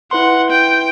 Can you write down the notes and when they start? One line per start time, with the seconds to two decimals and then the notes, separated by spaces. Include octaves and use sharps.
0.11 E4 B4 F#5 C6
0.50 G5